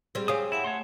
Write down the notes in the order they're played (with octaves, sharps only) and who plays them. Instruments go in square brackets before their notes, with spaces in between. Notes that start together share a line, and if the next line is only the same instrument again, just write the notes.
[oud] G3 C4 [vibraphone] G#4 C6
[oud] C4 C#4 [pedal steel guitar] G4 F5 D#6
[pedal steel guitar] E4 [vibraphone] E5 F#5 G#5
[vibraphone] A3 [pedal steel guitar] C#5 F#5 C6